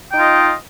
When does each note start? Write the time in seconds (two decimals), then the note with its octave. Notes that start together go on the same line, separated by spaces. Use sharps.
0.11 G5
0.14 D#4
0.18 F4
0.21 D#5